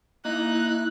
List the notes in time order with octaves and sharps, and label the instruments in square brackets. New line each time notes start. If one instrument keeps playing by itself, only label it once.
[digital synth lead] A#3 [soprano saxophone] D#4 [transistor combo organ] E4 [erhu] F#6